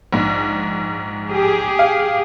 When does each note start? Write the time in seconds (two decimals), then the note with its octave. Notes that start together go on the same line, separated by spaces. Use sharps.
0.13 A#1 G#2
1.29 G4 G#4
1.79 F5